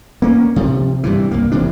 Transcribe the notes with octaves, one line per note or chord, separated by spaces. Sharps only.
A#3 C#4
C3 F3
G2 C3 E3
C2 A#3
E1 C3 E3 D4